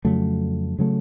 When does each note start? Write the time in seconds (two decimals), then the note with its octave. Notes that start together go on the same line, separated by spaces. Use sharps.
0.05 F2 C#3 F#3 A3
0.79 C#3 F#3 A3